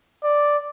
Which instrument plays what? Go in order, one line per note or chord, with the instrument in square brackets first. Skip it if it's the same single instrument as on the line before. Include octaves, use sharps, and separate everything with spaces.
[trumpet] D5